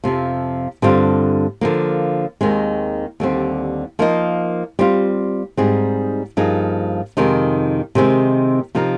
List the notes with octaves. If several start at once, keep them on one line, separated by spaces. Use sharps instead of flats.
F2 C3 F3
G2 D3 G3 C4 F4
D3 F3 A#3
D#2 D#3 G#3 C4
D#2 D3 G3 C4
F3 A#3 D#4 A#4 D#5
G3 C4 F4
G#2 G3 C4 D#4 G#4
G2 F3 A#3 D#4 G#4
F2 C3 D#3 G#3 D#4
C3 D#3 G#3 C4
C3 F3 C4 D#4 A#4